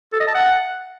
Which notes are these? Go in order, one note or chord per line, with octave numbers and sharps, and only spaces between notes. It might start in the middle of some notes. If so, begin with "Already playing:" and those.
A4
D#5
A5
F#5